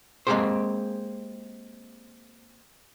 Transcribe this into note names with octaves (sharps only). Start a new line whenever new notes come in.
G#3 A#3 C4 G4 G#4 C5